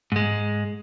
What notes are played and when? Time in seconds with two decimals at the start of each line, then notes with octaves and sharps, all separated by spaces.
0.12 G#2 G#3